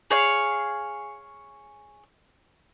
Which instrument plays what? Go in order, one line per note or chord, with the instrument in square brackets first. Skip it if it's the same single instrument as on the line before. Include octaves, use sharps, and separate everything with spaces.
[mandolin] G#4 C#5 F5